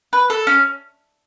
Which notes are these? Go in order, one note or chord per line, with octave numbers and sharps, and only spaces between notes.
B4
A4
C#4